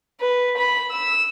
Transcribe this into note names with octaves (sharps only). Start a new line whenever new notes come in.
B4
B5
E6